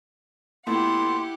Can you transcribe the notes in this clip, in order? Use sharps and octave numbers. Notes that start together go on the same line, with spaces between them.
A#2 A3 B3 E4 G4 F#5 C6